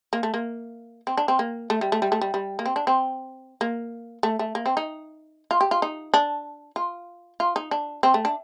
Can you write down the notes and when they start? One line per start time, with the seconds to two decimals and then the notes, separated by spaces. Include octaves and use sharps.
0.13 A#3
0.23 A3
0.34 A#3
1.07 C4
1.17 D4
1.28 C4
1.39 A#3
1.70 A3
1.81 G3
1.92 A3
2.02 G3
2.12 A3
2.21 G3
2.34 G3
2.59 A#3
2.66 C4
2.76 D4
2.87 C4
3.61 A#3
4.23 A3
4.39 A3
4.55 A#3
4.66 C4
4.77 D#4
5.51 F4
5.61 G4
5.71 F4
5.82 D#4
6.14 D4
6.76 F4
7.40 F4
7.56 D#4
7.71 D4
8.03 C4
8.14 A3
8.25 D4